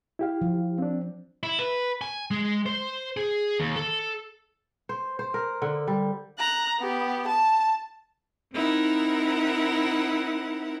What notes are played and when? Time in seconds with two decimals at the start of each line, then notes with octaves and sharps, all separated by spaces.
0.19 E4 G4 F5
0.41 F3
0.79 C4 D4
1.43 E4
1.60 B4
2.01 G#5
2.31 G#3
2.66 C5
3.17 G#4
3.60 D#2
3.76 A4
4.89 C5
5.19 C5
5.34 A#4
5.62 D3
5.87 G3
6.39 A#5 F#6
6.79 B3 G4
7.28 A5
8.52 C4 D#4 E4 A#4 F#5